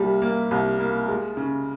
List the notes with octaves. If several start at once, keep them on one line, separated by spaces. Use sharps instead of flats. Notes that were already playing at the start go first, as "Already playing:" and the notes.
Already playing: C2 G3 A#3
A#3
C2
A#3
G#3
C#3